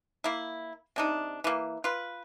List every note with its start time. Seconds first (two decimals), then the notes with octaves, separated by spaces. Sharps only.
0.24 A#3 E4
0.96 C3 D4 D#4
1.44 E3 A#3
1.84 F4 B4